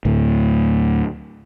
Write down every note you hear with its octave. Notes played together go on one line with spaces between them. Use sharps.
D2 A2